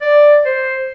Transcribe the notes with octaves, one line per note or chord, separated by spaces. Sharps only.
D5
C5